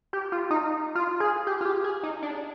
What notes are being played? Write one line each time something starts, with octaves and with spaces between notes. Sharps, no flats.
G4
F4
D#4
F4
G#4
G4
F4
G4
G#4
D#4
D4